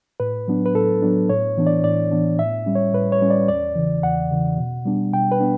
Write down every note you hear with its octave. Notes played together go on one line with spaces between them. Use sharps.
A2 B4
F#3 B3 D4
B4
A2 A4
F#3 B3 D4
A2 C#5
E3 B3 D4
D5
A2 D5
E3 B3 D4
A2 E5
G3 C#4
C#5
A2 B4
C#5
G3 C#4
D5
E2 D5
C#3 E3
E2 F#5
C#3 E3
B2
G3 B3 D4
B2 G5
B4
B3 D4